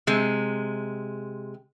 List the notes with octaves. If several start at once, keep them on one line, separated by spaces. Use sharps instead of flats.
C3 G#3